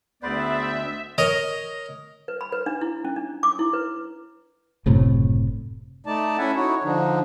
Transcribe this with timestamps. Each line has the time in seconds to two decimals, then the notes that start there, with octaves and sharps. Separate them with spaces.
0.23 D2 G#2 B3 B4 C5 D5 E5
1.18 A#4 C#5 D#5
2.28 B4
2.41 B5
2.52 B4
2.66 D4
2.81 E4
3.05 C#4
3.16 D4
3.43 D6
3.59 E4
3.73 B4
4.86 F#1 A2 C3
6.06 A3 D#4 D5 A5
6.38 C#4 E4 A4 E5 F#5 G#5
6.56 D#4 E4 F#4 C#5
6.84 D3 F3 D4 D#4